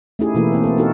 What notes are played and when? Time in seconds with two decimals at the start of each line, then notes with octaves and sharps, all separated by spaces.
0.19 A3 C#4 D#4 E4 G4 G#4
0.34 B2 E3 A3 A#3 E4
0.52 A#3 C4 B4
0.64 A#3 C4 A4
0.78 B3 D#4 F#4 A4 A#4